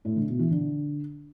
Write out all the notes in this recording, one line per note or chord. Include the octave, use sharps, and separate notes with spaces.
A2
D3
B2
E3
D3